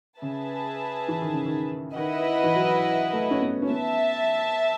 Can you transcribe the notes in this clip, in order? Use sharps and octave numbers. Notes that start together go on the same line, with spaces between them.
C#3 G#4 B4 E5 A5
E3
D#3
C#3
D#3
D#3 E4 B4 D#5 F#5
E3
F#3
A3
C#4
B3
C#4
B3 E5 A5